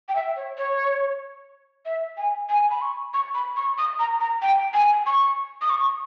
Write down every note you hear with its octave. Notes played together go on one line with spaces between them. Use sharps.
G5
E5
C#5
C#5
E5
G#5
G#5
B5
C#6
C#6
B5
C#6
D#6
A#5
A#5
G5
G#5
C#6
D#6
C#6